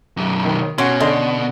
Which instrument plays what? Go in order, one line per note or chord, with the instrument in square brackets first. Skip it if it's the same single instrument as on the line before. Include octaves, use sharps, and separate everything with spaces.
[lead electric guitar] B1 F#2
[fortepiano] D#3
[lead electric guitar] B2 [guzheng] C#4 [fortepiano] F#4 C6
[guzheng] D3 [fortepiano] D#5 C6